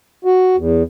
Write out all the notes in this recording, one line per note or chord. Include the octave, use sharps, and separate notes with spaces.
F#4
E2